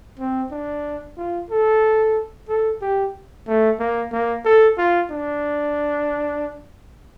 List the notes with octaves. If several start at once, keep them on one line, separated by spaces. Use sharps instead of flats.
C4
D4
F4
A4
A4
G4
A3
A#3
A#3
A4
F4
D4